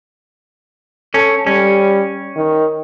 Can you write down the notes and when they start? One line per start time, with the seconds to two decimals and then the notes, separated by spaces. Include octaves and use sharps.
1.14 C#4 A4
1.47 G3 C#4
2.36 D#3